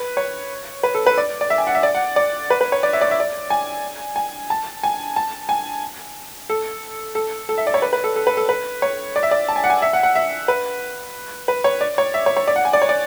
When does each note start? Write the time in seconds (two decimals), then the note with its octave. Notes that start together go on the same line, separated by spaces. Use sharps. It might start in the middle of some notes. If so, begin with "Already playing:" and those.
Already playing: B4
0.17 C#5
0.83 B4
0.94 A4
1.06 B4
1.18 D5
1.41 D5
1.50 E5
1.58 G#5
1.67 F#5
1.75 E5
1.83 D5
1.95 F#5
2.16 D5
2.50 B4
2.61 B4
2.72 C#5
2.83 D5
2.93 E5
3.01 D5
3.11 E5
3.20 D5
3.50 G#5
4.16 G#5
4.50 A5
4.83 G#5
5.16 A5
5.49 G#5
6.49 A4
7.15 A4
7.49 A4
7.58 E5
7.67 D5
7.74 C#5
7.82 B4
7.93 B4
8.04 A4
8.16 A4
8.27 B4
8.37 A4
8.49 B4
8.82 C#5
9.16 D5
9.23 E5
9.31 D5
9.48 A5
9.56 G#5
9.64 F#5
9.70 G#5
9.82 E5
9.93 F#5
10.03 F#5
10.15 E5
10.48 B4
11.48 B4
11.64 C#5
11.81 D5
11.98 C#5
12.14 E5
12.26 C#5
12.37 C#5
12.48 D5
12.56 F#5
12.65 G#5
12.73 D5
12.82 C#5
12.89 D5